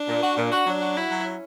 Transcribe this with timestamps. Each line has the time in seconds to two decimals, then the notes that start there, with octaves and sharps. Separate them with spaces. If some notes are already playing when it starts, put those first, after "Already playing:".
Already playing: D4
0.08 A#2
0.22 F#4
0.37 A#2
0.52 F#4
0.67 F#3 D4
0.81 F#4
0.96 E4 F#4
1.10 F#3
1.25 C#4